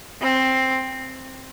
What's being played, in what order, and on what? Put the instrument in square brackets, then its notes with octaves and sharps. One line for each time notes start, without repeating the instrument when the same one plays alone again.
[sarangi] C4